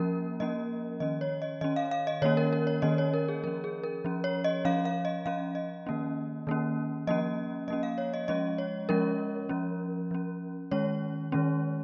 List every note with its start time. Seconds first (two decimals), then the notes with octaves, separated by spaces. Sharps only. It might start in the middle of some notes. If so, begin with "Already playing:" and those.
Already playing: F3 A#3 C#4 A#4
0.40 F3 A#3 C#4 D#5
1.00 D#3 C#4 D#5
1.21 C#5
1.42 D#5
1.61 D#3 C#4 D#5
1.76 F5
1.91 F5
2.07 D#5
2.22 D#3 A#3 C#4 C#5
2.37 A#4
2.53 A#4
2.67 C#5
2.82 D#3 A#3 C#4 D#5
2.98 C#5
3.13 A#4
3.28 G#4
3.44 F3 C#4 A#4
3.64 G#4
3.83 A#4
4.05 F3 C#4
4.24 C#5
4.44 D#5
4.65 F3 C#4 F5
4.85 F5
5.05 D#5
5.26 F3 C#4 F5
5.55 D#5
5.87 D#3 A#3 C#4
6.47 D#3 A#3 C#4
7.07 F3 A#3 C#4 D#5
7.68 F3 A#3 C#4 D#5
7.83 F5
7.98 C#5
8.14 D#5
8.28 F3 G#3 C#4 D#5
8.58 C#5
8.89 F3 G#3 C#4 A#4
9.49 F3 C#4
10.11 F3 C#4
10.71 D#3 G#3 C#4 C#5
11.32 D#3 G#3 C#4